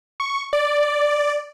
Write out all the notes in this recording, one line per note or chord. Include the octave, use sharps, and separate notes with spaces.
C#6
D5